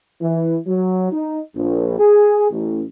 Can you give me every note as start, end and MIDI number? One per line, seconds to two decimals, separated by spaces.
0.20 0.57 52
0.67 1.11 54
1.11 1.39 63
1.55 1.96 34
1.99 2.46 68
2.50 2.82 33